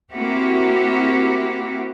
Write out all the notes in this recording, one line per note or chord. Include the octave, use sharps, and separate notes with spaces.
A#3 C4 E4 F#4 G4